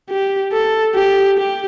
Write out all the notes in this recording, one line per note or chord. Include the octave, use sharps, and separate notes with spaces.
G4
A4
G4
G4